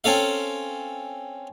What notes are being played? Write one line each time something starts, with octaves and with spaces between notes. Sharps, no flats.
C4 C#4 A4 F5